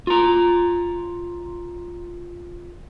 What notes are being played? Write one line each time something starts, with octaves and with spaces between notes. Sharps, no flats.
F4 A#5